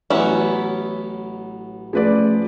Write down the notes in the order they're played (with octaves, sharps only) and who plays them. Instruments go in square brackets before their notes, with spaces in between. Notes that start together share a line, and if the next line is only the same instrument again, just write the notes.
[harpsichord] A1 F#3 [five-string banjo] B3 C#4 E4
[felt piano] F3 B4 D5 [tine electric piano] A3 C#4 G#4